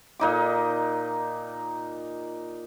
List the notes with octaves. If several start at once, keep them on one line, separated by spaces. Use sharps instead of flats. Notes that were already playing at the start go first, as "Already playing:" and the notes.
A#2 D#4 D6